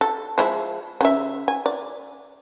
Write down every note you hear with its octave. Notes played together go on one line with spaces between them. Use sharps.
A4
F3 G#3 E4
C#3 E5
G#5
D5